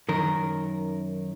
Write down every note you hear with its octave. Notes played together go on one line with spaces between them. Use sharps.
F#2 D#3 A#4